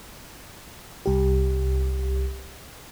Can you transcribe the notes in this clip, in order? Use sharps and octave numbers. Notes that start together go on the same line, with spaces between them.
C2 G4